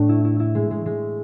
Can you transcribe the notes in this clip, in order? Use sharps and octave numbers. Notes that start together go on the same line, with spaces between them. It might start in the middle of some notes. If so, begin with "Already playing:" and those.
Already playing: A2 A3 D4
E4
E4
E4
G#3
G#3
G#3